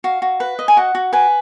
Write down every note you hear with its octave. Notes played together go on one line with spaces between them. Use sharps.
F#4 F5
F#4
B4
D#5
G#5
F#4 F#5
F#4
B4 G#5